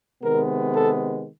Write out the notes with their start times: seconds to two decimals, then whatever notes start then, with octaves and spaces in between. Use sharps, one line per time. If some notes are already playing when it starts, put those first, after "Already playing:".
0.23 C3 D#3 G#3 B3 A#4
0.75 A4